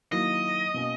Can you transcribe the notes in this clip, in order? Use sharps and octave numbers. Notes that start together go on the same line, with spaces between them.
D#3 F#3 A#3 E4 D#5
B2 A#3 C#4